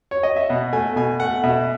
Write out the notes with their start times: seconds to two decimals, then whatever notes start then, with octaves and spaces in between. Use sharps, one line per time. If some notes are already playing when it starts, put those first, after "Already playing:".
0.11 C#5
0.23 D#5
0.36 E5
0.50 B2 F#5
0.73 A3 G#5
0.96 B2 G#5
1.20 A3 F#5
1.43 B2 E5